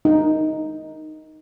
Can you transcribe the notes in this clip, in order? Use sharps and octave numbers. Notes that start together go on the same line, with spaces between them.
D#4